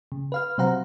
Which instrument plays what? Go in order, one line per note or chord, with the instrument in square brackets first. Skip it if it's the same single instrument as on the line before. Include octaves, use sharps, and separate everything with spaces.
[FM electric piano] C#3
B4 F5 F6
C3 F#3 C5 F5 F#5 A#5